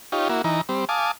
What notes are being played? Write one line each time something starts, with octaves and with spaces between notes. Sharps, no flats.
D#4 F4 G4 C#5
A#3 E4 F#4
E3 D#4 A#5
G3 C4
F5 G#5 A5 D6 D#6